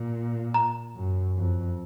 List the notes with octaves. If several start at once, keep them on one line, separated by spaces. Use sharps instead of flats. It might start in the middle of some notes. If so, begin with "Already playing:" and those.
Already playing: A#2
A#5
F#2
F2